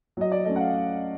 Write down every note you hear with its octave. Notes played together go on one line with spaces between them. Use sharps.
F#3 D#5
D5
A3 C#4 D#5
F#5
F5